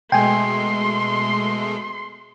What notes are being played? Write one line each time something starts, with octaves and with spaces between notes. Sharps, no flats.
B2 G#3 A3 G5 G#5 C6